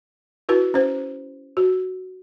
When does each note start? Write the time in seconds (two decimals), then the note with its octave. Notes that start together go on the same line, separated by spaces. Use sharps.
0.49 E4 F#4 B4
0.74 C#4 C5
1.57 F#4